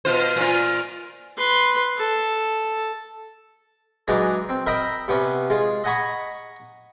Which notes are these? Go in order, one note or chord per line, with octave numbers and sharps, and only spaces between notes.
B2 F4 C5
A#2 F4
B4 C6
A4
E3 F#3 G#3 D4 D#4
C4
A#4 D#5 E5 G5 A#5 B5
C3 B3 C#4
G#3 F4
D#5 F#5 G#5 A#5 B5 C#6